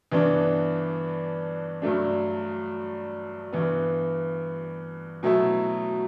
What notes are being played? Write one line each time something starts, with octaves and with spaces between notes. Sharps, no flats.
G2 E3 B3 D4
G2 F#3 A3 D4
G2 E3 B3
B2 F#3 A3 E4